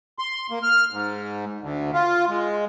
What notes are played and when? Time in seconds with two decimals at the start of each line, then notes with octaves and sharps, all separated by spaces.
0.19 C6
0.51 A#3
0.63 F6
0.91 G#2
1.60 D2
1.94 F4
2.29 G#3